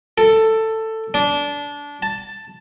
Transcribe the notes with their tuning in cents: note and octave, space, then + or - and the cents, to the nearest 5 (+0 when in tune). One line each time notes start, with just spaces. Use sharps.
A4 +10
D4 -20
A5 +5